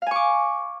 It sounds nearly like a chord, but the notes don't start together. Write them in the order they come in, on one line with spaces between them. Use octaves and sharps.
F5 G#5 C#6 D6